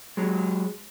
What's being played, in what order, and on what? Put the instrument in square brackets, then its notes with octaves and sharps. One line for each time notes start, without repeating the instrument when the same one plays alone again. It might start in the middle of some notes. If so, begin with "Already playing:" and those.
[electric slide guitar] F#3 G#3